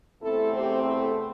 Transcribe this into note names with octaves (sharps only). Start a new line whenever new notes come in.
E2 C3 A3 C4 E4 A4
G4 C5
E4 A4